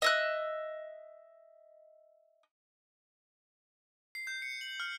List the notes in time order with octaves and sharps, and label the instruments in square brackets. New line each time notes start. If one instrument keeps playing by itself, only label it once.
[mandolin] D#5 E5 F#6
[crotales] C7
G6
C#7
F#7
F6